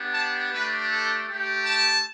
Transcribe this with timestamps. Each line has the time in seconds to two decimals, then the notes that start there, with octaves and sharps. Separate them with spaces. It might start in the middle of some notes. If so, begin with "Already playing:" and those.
Already playing: B3 D4 G4
0.13 A5
0.51 A3 D4 G4 B4
0.88 A4
1.26 A3 G4
1.64 A5